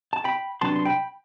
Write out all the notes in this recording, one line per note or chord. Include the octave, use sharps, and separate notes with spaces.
A5
G5 B5
C3 F#3 B3 D4 A5 C6
C6
G5 B5